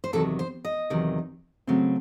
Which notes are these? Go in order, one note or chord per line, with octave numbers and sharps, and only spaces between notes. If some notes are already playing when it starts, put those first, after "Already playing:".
C5
E2 C3 D#3 F#3 A4
C5
D#5
E2 C3 D#3 F#3
C#3 F#3 A3 C4